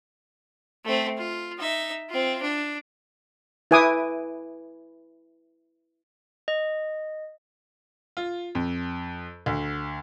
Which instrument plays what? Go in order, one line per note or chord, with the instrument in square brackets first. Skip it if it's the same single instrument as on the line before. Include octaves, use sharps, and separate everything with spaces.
[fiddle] A3 C4
F4
D#4 E5
C4 F4
D4
[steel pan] E4 B4 G#5 D6 D#6
[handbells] D#5
[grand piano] F4
F2
D2